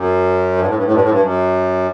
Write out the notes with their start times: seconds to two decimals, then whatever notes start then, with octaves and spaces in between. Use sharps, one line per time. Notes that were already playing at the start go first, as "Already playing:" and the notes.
Already playing: F#2
0.58 G2
0.66 A2
0.75 G2
0.84 A2
0.91 G2
1.01 A2
1.09 G2
1.20 F#2